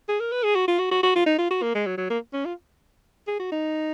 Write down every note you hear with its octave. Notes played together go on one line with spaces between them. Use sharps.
G#4
A#4
B4
G#4
F#4
F4
F#4
F#4
F#4
F4
D#4
F4
F#4
A#3
G#3
F#3
F#3
A#3
C#4
F4
G#4
F#4
D#4